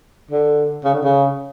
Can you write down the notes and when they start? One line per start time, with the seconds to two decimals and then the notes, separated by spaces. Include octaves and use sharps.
0.31 D3
0.84 C#3
0.94 D3
1.03 C#3